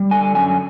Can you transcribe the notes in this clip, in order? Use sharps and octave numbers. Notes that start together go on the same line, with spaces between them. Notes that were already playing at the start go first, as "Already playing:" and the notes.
Already playing: G3
D3 G#5
F#2 G#5